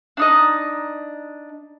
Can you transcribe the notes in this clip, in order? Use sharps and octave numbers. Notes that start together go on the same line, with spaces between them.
D4 D#4 D#5